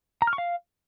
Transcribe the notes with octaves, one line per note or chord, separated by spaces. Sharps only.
A#5
F6
C#6
F5